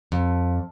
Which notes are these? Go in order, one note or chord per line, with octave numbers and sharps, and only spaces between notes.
F2